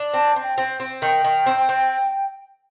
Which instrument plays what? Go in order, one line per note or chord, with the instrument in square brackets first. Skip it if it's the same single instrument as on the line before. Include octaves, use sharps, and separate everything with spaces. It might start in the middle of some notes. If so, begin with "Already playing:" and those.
Already playing: [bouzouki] D4
[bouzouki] C4 [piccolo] A5
[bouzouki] C4
[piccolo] G5
[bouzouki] C4
C4
[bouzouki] D#3 [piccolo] G5
[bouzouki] D#3
C4
C4